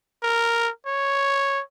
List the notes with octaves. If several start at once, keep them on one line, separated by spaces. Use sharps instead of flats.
A#4
C#5